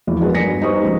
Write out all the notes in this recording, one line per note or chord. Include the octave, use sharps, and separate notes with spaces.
E2 E3 F3
G#3 D4 F#4 G#4 A#4 B4
G1 G#5 A#6 B6 C#7
D#4 G4 B4 C5 C#6 D#6
C#2 F3